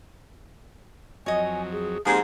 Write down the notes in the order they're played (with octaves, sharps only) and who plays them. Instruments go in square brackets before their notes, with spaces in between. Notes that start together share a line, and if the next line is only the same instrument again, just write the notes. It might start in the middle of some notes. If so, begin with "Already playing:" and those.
[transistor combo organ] F2 F#3 [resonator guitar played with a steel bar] C#5 D#5 [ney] G#5
[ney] G#4
[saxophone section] G#2 G#3 G#4 [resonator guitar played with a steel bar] F3 A#3 C4 [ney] G4